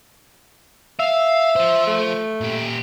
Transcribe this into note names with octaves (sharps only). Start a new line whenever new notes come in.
E5 F5
F4 C5
A3
A#2 G4